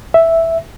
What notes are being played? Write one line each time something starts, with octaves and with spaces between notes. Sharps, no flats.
E5